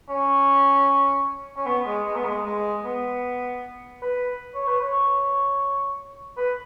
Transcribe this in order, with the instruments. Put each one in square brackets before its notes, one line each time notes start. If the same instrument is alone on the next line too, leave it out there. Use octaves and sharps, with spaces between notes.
[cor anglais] C#4
C#4
B3
G#3
G#3
B3
G#3
G#3
B3
B4
C#5
B4
C#5
B4